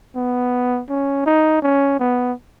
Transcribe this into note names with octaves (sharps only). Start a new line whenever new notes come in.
B3
C#4
D#4
C#4
B3